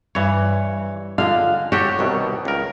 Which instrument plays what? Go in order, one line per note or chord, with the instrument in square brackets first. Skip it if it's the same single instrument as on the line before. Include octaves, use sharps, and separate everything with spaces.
[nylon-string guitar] G2 [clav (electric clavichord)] E3 C#5
[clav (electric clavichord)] D3 G#3 [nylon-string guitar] F4 F5
[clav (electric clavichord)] F#4 G4 A4 [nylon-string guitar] C#5
[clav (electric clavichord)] C2 B2 D#3
C#2 A#4